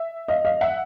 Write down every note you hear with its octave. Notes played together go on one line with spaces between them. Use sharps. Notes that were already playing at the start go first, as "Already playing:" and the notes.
Already playing: E5
D#5 F5
D#5 F5
E5 F#5